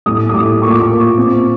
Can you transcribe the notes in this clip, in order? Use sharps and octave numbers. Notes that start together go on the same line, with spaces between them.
A2 D#6
D#6
A2 D6
A#2 C#6
D6
C#6
A#2
C4